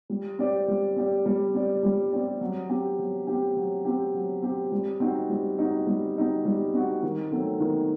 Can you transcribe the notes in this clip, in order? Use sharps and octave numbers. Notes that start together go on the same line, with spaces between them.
G3
C4 G4 D5
G3
C4 G4 D5
G3
C4 G4 D5
G3
C4 G4 D5
F#3
C4 G4
F#3
C4 G4
F#3
C4 G4
F#3
C4 G4
G3
C4 D#4 F#4
G3
C4 D#4 F#4
G3
C4 D#4 F#4
G3
C4 D#4 F#4
D#3
F#3 A3 C4
D#3